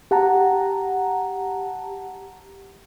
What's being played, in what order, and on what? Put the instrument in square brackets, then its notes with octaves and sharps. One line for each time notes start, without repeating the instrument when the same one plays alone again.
[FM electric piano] G4 F#5 A5 A#5